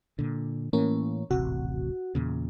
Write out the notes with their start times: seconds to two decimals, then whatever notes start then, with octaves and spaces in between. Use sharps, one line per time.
0.19 A#2 D3
0.73 A2 E3 A#3 C#4
1.31 D#1 A1 C3 F#4
2.15 E2 A#2 C#3